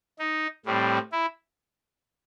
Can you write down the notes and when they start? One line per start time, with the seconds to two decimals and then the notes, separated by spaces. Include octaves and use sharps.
0.19 D#4
0.66 A2 G3 C4
1.12 E4